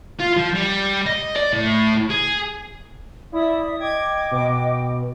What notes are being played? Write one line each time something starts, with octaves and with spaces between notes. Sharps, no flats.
F4
F3
G3
D#5
D5
A2
G#4
E4 D5 E5 D#6
D#5 G5 D6 G#6
B2